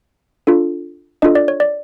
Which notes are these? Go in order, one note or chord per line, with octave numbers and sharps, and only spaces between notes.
D4 F4 A4
D4 F4 A4 D#5
D5
C#5
D5